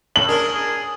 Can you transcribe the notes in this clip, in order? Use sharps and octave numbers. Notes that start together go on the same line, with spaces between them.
A2 C#3 F#7
D4 G#4 A#4
G#4